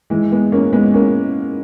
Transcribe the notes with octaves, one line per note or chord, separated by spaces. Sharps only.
E3 G#3
G#3 B3
A#3 C#4
G#3 B3
A#3 C#4